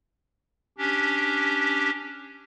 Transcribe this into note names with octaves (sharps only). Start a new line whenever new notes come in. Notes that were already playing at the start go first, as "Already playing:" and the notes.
C#4 D4 G4